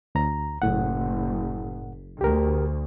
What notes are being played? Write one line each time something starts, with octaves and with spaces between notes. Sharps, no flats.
D2 A#5
F#1 A2 F#5
D2 G4 A#4